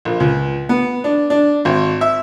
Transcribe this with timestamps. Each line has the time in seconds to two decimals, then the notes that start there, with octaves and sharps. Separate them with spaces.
0.05 A#1
0.20 C#2
0.69 B3
1.04 D4
1.30 D4
1.65 G#1
2.01 E5